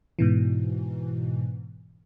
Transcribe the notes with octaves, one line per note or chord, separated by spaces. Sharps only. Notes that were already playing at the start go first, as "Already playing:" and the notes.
G#2 B2 E3